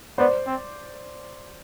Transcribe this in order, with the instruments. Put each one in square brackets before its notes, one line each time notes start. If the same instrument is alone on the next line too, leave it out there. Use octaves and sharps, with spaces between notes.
[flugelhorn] B3 [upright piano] C5 D5
[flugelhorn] C4